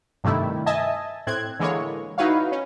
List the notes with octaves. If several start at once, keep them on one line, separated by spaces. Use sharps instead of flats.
G2 C3 D#3 A3 E4
D#5 E5 G#5 A5 D#6
A2 C4 F#6 G#6
D3 E3 G#3 A#3 C#5
D#4 E4 F#4 B4 C#5 F5
C#4